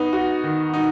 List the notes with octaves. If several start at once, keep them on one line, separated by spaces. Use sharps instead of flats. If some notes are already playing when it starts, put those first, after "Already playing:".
Already playing: B3 D#4
F#4
D#3
D#4